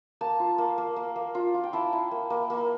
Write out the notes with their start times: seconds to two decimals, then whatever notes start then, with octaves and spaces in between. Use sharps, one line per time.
0.21 A#3 A5
0.40 F4
0.58 A#3
0.78 A#3
0.96 A#3
1.16 A#3
1.35 F4
1.54 F4
1.64 G5
1.73 E4 A5
1.93 E4
2.11 A#3
2.30 A#3
2.50 A#3